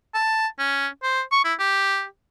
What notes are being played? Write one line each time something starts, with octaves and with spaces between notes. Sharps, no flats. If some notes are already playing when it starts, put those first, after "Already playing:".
A5
C#4
C5
C#6
E4
G4